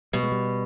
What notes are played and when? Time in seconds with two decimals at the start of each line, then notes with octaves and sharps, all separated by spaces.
0.13 B2 G3
0.23 G#3
0.32 G3